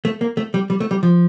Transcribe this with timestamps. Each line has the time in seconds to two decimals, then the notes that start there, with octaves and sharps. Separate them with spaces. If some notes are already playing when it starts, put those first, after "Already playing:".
0.05 A3
0.21 A#3
0.37 A3
0.54 G3
0.70 G3
0.80 A3
0.91 G3
1.03 F3